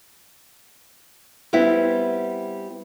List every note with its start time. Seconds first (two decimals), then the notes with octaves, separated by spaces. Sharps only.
1.53 G3 B3 C4 E4